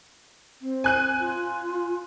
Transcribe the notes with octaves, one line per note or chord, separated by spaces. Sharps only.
C4
G#5 F#6 D#7
F4